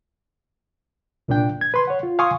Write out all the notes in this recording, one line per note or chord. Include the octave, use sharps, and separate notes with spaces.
C2 A#2 A#3 D4 G5
G#6
B4 C6
C#5 F#5
F4
F5 G#5 C6 C#6 D#6